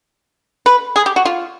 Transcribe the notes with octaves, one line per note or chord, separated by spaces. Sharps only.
B4
G#4
G4
F#4
F4